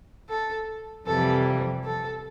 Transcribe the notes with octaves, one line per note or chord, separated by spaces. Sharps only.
A4
F2 C3 E3 G3 A4
A4